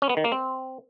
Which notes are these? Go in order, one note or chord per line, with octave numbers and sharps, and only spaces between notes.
C#4
B3
D#3
A#3
C4